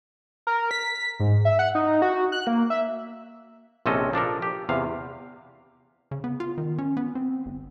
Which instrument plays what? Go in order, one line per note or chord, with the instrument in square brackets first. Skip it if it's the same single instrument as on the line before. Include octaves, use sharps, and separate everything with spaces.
[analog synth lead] A#4
B6
G#2
E5
F#5
D#4
F#4
F#6
A#3
E5
[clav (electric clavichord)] A#1 C3 C4 C#4 A4 D#5
F3 D4 A4 A#4
G4
E2 C3 F5
[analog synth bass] C#3
B3
F4
D#3
C#4
B3
C4
G1